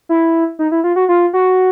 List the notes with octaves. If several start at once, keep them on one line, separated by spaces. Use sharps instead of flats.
E4
D#4
E4
F4
F#4
F4
F#4